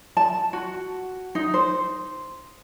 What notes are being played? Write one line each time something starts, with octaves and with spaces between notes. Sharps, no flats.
A5
F#4
D#4
C5